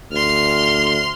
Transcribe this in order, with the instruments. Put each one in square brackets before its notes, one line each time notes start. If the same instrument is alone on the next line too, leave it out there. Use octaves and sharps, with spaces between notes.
[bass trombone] D2 [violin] C6 F6